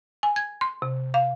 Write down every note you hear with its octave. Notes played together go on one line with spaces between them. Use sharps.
G#5
G#6
C6
C3
F5